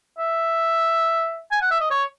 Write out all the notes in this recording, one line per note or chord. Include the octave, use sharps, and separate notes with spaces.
E5
G#5
F#5
E5
D#5
C#5